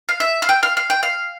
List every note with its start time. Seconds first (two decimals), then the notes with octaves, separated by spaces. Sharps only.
0.09 F5
0.20 E5
0.42 F5
0.49 G5
0.63 F5
0.77 F5
0.90 G5
1.03 F5